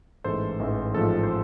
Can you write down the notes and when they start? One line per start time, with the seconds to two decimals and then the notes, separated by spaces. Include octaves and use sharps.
0.24 A1 G#2 E3 A3 A4 C5
0.59 A1 G#2 E3 A3
0.94 A1 G#2 F3 A3 A4 C5
1.23 C5